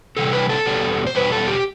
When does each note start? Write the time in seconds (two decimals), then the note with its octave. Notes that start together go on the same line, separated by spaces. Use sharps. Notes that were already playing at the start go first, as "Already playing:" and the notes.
0.17 C3 E3 G3 A4
0.33 B4
0.49 A4
0.65 E2 B2 G3
1.06 C5
1.15 E2 B2 G3 B4
1.32 A4
1.48 G4